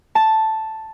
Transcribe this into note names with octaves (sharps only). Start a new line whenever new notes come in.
A5